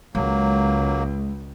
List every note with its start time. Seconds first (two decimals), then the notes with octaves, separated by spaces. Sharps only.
0.15 C#2 F#3 G#3 A#3